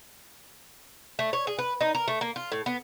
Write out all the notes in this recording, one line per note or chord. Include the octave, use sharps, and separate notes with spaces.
A3
C#5
G#4
B4
D#4
A#4
A3
A#3
F4
A2
B3